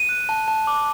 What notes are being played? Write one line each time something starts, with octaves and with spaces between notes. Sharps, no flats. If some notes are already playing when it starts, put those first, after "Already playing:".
Already playing: D#7
F#6
A5
A5
D6